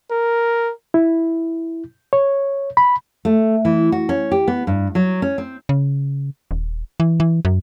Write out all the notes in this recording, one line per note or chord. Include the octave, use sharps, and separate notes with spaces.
A#4
E4
C#5
B5
A3
E3
F#4
C#4
G4
B3
G2
F#3
C#4
C4
C#3
D#1
E3
E3
F#2